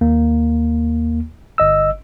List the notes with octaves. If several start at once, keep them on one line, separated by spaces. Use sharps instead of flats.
D#2 A#3
G1 D#5 E6